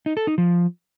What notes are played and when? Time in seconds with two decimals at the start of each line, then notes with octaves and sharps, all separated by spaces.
0.06 D#4
0.17 A4
0.27 D#4
0.38 F3